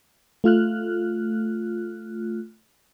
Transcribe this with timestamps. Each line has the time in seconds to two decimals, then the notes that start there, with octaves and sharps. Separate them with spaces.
0.44 A3 F4 F6 F#6